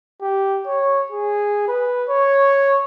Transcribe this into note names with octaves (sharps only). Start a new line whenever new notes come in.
G4
C#5
G#4
B4
C#5